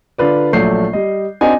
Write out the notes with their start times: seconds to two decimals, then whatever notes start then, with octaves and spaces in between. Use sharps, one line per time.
0.18 D3 F4 B4 D5
0.53 A#1 F#3 A3 D5 G6 C7
0.93 G3 D#5
1.41 C4 D4 D#4 F#4 G#5